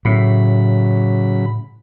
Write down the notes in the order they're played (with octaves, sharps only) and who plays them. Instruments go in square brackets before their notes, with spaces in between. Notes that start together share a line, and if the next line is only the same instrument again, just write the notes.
[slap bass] A2 [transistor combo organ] C#3 F#3 B5